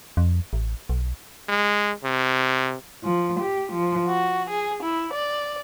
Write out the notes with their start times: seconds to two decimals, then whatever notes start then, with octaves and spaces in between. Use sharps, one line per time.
0.17 F2
0.53 A1
0.89 B1
1.49 G#3
2.04 C3
3.03 F3
3.40 G4
3.72 F3
4.07 F#4
4.49 G#4
4.83 E4
5.13 D5